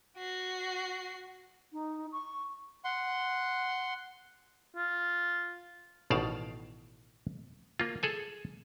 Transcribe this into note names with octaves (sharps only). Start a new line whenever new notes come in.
F#4 C7
D#4
C#6
F#5 C6
F4
A1 B2 D#3 D5 F5 A5
A#3 F4
G#4 A4 G#5